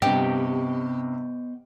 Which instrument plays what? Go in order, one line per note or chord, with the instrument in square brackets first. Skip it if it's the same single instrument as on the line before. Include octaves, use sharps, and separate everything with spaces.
[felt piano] G2 C3 [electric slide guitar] B3 C5 D#5 [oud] G4